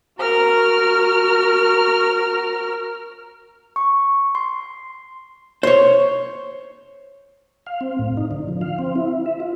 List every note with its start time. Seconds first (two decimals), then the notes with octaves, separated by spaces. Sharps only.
0.19 F#4 A#4 F6
3.76 C#6
4.35 C6
5.63 C5 C#5
7.67 F5
7.81 C4
7.99 A2
8.17 D#4
8.31 D3
8.48 F3
8.61 F5
8.79 C4
8.96 E4
9.26 E5
9.40 F4